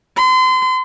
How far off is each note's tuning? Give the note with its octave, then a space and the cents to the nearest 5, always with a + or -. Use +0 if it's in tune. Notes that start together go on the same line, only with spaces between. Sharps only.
C6 -35